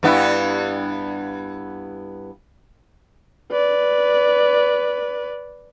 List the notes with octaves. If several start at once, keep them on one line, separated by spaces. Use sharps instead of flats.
G2 B3 E4
B4 D5